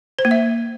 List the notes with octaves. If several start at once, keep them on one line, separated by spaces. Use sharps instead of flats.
C5
A#3
E5